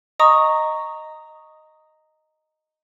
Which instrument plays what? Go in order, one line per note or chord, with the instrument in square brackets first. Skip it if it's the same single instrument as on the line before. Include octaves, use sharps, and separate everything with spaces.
[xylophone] D#5 A#5 C#6 D#6